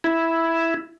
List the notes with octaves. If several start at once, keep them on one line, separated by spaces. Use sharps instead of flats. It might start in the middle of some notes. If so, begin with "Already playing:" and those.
E4